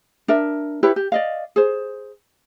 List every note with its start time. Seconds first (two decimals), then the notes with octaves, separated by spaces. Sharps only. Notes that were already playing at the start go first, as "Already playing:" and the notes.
0.28 D4 A#4 E5
0.83 E4 G4 B4 C#5
0.96 G4
1.12 D5 D#5 F5
1.56 G#4 C5